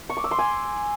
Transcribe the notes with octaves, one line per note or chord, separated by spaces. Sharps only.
C#6
D6
E6
C6
G#5